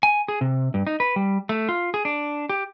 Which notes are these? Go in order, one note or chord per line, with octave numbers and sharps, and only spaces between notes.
G#5
G#4
C3
G2
D#4
B4
G3
A3
F4
G#4
D4
G4